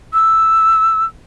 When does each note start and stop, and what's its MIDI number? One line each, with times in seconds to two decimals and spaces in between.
0.13 1.05 88